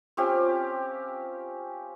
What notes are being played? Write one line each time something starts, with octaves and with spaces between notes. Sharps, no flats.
C4 C#4 F4 G4